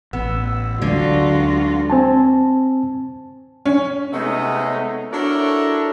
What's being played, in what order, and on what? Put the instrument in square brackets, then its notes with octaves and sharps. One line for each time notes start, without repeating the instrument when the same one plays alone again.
[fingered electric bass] A1 [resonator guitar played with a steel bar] B3 [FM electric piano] E6
[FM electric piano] D2 [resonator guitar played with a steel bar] D3 [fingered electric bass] F#3 G#3 D4 [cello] F4 F#4
[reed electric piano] C4 G#5 A5
[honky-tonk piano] C#4
[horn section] C3 G#3 A3 B3 C#4 D#4
D4 E4 F#4 A4 A#4 C#5